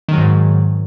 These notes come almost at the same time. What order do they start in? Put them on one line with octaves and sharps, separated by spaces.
D#3 F#3 G#2